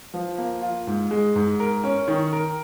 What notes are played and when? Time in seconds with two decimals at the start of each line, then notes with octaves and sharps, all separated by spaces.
0.14 F3
0.38 A#3
0.62 F4
0.87 G#2
1.11 G#3
1.36 G#2
1.60 A#4
1.84 C#4
2.08 D#3
2.33 A#4